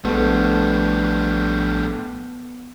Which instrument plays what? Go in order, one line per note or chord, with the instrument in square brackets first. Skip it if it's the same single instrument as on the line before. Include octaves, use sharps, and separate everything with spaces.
[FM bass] A#1 [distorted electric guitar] A2 G3 [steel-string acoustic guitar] A3 B4 [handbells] B3